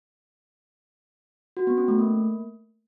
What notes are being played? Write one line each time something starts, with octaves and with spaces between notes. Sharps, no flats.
F#4
B3
C#4
A3
A#3